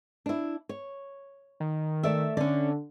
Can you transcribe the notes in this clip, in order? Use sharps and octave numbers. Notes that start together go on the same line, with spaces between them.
D4 E4
C#5
D#3
A3 D5 E5
D3 C#4 D5